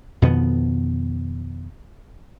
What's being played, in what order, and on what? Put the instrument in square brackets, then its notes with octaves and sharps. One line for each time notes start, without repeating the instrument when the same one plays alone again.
[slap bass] F2 B2 D#3 B3